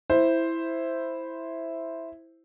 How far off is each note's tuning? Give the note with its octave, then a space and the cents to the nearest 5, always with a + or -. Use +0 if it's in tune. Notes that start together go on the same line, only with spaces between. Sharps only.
E4 +0 C5 +0